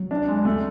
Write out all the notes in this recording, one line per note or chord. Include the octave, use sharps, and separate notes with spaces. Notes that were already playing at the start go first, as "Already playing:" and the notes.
Already playing: F#3
D4
G#3
A3